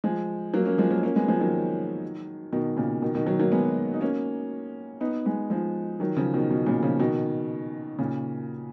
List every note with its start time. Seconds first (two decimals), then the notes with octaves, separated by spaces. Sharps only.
0.04 F3 G#3
0.54 F#3 A#3
0.65 A#3 C#4
0.78 F3 G#3
0.91 F#3 A#3
1.03 A#3 C#4
1.16 G#3 B3
1.28 F3 G#3
1.41 D#3 F#3
2.52 B2 D#3
2.77 A#2 C#3
3.02 B2 D#3
3.15 B2 D#3
3.26 D#3 F#3
3.40 F#3 A#3
3.52 G#3 B3
3.94 D#4
4.01 A#3 C#4
5.01 B3 D#4
5.25 G#3 B3
5.50 F3 G#3
6.00 D#3 F#3
6.17 C#3 F3
6.34 B2 D#3
6.51 B2
6.66 A#2 C#3
6.83 C#3 F3
7.00 B2 D#3
7.99 A#2 C#3